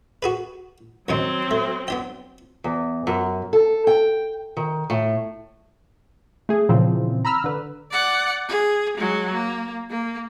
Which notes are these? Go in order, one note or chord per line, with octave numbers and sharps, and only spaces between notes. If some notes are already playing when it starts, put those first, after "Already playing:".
F#4 G#4 B4
F#2 D#3 F#3 C4 D#4
A3
B3 D4 G5
E2
F#2
A4
G5
D#3
A2
A3 G#4
A#2 C#3 E3 F3 C4
A#5 B5 E6 F6
D3 B4
D5 F#5
G#4
F#3 G#3
A#3
A#3